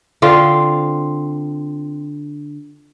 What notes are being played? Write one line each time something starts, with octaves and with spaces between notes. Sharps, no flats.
D3 C4 F4